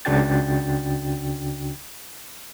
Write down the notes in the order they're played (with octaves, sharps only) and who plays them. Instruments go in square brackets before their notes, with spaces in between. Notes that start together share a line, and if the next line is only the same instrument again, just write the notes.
[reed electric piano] C#2 C#3 D4 F#4 G5 A6